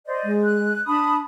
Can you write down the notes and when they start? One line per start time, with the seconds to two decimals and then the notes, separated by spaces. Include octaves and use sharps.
0.06 C5 D5 D#5
0.24 G#3
0.44 F#6
0.87 D4 A5 B5 D#6